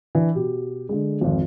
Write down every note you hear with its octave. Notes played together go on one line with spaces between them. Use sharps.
E3 D4
B2 G4
D3 G#3
G#1 F2